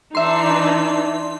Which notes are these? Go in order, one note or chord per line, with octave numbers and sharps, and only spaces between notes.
E3 D4 D#4 E5 C6